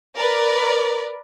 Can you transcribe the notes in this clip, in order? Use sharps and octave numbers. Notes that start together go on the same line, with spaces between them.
A#4 B4 D5